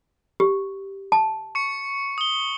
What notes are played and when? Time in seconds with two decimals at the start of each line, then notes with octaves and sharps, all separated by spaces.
0.40 G4
1.12 A5
1.55 C#6 C#7
2.18 D#6 G7